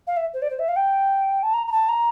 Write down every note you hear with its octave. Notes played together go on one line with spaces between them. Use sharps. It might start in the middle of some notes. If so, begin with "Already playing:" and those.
F5
E5
C5
D5
C5
E5
F5
G5
A5
A#5
A#5
A5
A#5